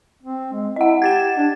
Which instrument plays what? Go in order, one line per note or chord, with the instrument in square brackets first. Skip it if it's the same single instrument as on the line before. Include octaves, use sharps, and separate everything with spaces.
[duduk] C4
G#3
[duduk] E4 [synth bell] D#5 F#5
[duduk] G4 [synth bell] G#6 A6 E7
[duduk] D4